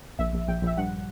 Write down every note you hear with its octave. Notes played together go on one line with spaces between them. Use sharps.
A#1 E5
A#1
A#1 G5
A#1
E5
G2 F#5